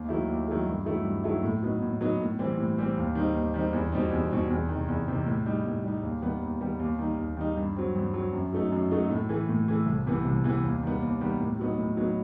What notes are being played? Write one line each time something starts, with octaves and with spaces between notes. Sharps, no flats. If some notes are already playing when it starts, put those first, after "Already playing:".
Already playing: D#2
D#3 F#3 A3 E4
D#2
D#3 F#3 A3 E4
G2
D#3 F#3 A3 E4
G2
D#3 F#3 A3 E4
A2
F#3 B3 D#4
A2
F#3 B3 D#4
A2
E3 G3 C4
A2
E3 G3 C4
D#2
D#3 G3 C4 D#4
D#2
D#3 G3 C4 D#4
E2
B2 G3 C4 D#4
E2
B2 G3 C4 D#4
E2
C3 D#3
E2
C3 D#3
A2
G3 D#4
A2
G3 D#4
D#2
D#3 G3 B3
D#2
D#3 G3 B3
D#2
D#3 G3 D#4
D#2
D#3 G3 D#4
G2
F#3 C4
G2
F#3 C4
F#2
F#3 A3 D#4
F#2
F#3 A3 D#4
A2
E3 A3
A2
E3 A3
C2
C3 E3 B3
C2
C3 E3 B3
D#2
D#3 G3 B3
D#2
D#3 G3 B3
A2
F#3 B3 D#4
A2
F#3 B3 D#4